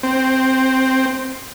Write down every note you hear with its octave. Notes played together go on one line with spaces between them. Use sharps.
C4